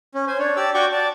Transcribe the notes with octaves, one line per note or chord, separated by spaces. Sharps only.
C#4
C5 G#5
D4 C#5
G4 D5 A5 E6
F#4 D5 G5 C#6 D6
D5 A5